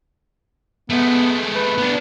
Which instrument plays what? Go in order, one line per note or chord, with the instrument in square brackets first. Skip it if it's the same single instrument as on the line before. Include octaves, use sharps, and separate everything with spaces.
[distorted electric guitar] G#3 A3 [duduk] B3
[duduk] B4
[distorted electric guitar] B3 D4